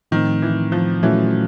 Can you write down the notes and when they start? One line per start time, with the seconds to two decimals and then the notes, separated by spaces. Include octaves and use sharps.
0.11 A2 D#3 F3 A3 C4
0.42 E3
0.72 F3
1.02 A#2 E3 F#3 A3 C#4 F#4